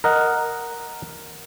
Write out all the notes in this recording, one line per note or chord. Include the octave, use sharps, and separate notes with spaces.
A#4 D#5 F#5